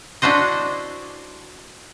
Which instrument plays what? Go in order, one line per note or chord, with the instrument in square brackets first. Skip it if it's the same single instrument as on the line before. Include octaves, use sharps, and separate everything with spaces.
[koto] D4 E4 F#4 C5 D#5